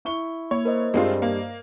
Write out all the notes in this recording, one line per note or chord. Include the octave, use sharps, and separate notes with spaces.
E4 C#6 G7
A#3 C#5
A#4 C5 D#5
G2 G3 G#3 C4 F4
A#3